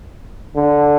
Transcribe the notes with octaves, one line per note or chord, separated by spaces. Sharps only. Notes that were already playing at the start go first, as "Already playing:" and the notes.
D3